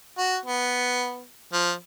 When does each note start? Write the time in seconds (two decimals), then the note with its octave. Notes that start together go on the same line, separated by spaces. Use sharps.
0.18 F#4
0.46 B3
1.53 F3